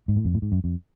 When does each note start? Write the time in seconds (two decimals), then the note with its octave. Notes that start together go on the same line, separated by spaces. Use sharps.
0.08 G#2
0.16 A2
0.25 F2
0.34 A2
0.42 G#2
0.52 F#2
0.64 F2